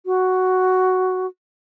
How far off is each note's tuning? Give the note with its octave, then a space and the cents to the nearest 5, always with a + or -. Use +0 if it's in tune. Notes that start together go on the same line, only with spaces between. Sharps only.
F#4 +5